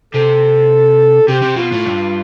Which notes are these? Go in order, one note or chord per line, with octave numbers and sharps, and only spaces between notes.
C3 A4
C3 G4
C3
B2 F4
A2
G2